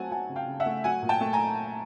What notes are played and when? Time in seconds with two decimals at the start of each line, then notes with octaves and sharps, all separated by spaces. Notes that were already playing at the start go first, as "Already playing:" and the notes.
Already playing: F#3 A3 C4 F#5 G#5 A5
0.11 F#3 F#5 G#5
0.30 C#3
0.36 F5 G5
0.48 C#3
0.60 E5 F#5
0.66 A3
0.84 F#3 F#5 G#5
1.02 A#2
1.09 G5 A5
1.21 A3
1.33 G#5 A#5